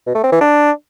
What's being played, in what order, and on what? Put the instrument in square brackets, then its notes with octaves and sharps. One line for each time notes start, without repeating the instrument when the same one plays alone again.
[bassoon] B2
A3
C4
E3
D4